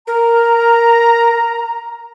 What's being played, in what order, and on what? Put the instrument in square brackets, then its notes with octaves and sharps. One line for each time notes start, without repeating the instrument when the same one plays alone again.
[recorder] A#4 [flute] A#5